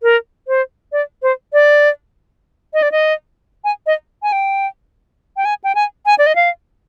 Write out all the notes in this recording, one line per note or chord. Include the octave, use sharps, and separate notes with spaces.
A#4
C5
D5
C5
D5
D#5
D5
D#5
G#5
D#5
G#5
G5
G5
G#5
G5
G#5
G#5
D5
D#5
F5